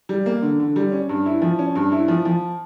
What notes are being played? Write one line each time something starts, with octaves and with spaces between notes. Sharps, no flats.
G3
A#3
D3
D3
G3
C#4
G2
E4
F3
C#4
G2
E4
F3
F3